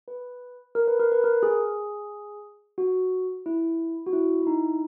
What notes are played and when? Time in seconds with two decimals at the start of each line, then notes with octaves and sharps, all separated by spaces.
0.08 B4
0.75 A#4
0.88 B4
1.00 A#4
1.12 B4
1.24 A#4
1.43 G#4
2.78 F#4
3.46 E4
4.06 F#4
4.13 E4
4.42 E4
4.47 D#4